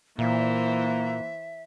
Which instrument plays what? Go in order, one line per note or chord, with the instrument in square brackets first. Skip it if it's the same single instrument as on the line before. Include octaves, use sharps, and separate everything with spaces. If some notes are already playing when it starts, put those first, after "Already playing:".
[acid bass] A#2 [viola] E3 C5 [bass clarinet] A#3 [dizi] E5